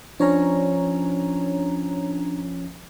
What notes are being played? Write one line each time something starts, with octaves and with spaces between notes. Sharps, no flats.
F3 C#4 D4 C#5 A#5